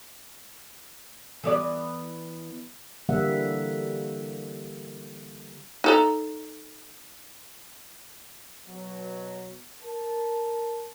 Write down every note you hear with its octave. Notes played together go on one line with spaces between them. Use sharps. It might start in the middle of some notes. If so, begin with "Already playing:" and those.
E3 B3 D5
D3 E3 G3 A#3 E5 F#5
D#4 A4 A#5
B2 F#3
A#4 A5